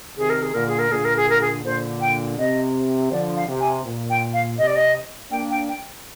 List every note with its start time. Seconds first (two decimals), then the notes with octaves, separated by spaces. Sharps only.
0.17 C3 D#3 G#4
0.30 A#4
0.42 G#4
0.54 A#2 D3 A#4
0.67 G#4
0.79 A#4
0.90 A#2 D3 G#4
1.05 A#4
1.16 G#4
1.30 A#4
1.41 G#4
1.64 A#2 D3 C5
2.01 G5
2.38 C3 D#5
3.11 D3 F3 D5
3.36 F5
3.48 C3
3.60 G#5
3.85 A#2
4.10 G5
4.33 F5
4.58 C3 D#5
4.67 D5
4.75 D#5
5.31 A#3 D4 G5
5.51 G5
5.69 G5